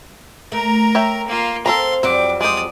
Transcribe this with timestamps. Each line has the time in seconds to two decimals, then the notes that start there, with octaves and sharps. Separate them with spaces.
0.52 A3 A#4 A#5
0.95 C#5 E5 G5
1.27 A#3 F4
1.66 C4 A4 A#4 F5 A#5 C6
2.03 F2 F#3 G3 C4 F#5 D6
2.41 G#3 C5 D5 D#6